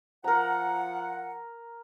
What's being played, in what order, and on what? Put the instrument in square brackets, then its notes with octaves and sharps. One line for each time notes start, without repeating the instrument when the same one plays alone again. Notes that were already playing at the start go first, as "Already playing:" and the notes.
[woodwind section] F3 F#5 [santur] A#4 A#5